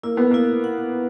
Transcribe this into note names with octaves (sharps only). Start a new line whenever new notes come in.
A#3 E4
B3
A#3 E4
F#5